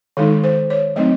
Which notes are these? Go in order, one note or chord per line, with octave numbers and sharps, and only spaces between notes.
D#3 G#3 D#4 A4
C5
C#5
F#3 A3 C4 D#4 D#5